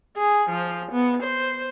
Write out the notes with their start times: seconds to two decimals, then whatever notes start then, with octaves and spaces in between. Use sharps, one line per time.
0.17 G#4
0.50 F3
0.92 B3
1.23 C5